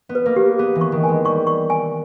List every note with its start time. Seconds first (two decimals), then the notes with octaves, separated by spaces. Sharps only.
0.09 B3
0.15 B4
0.26 A#3
0.36 G4
0.58 B3 G#4
0.75 E3
0.81 C#6
0.92 D#3
1.04 G#5
1.09 G#3
1.25 G3 C#6
1.47 C#6
1.70 G#5